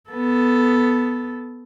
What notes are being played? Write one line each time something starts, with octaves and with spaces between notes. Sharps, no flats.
B3 A4